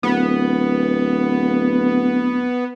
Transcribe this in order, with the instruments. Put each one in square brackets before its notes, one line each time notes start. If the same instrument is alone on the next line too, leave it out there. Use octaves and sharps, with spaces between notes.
[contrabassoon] D1 [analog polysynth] B3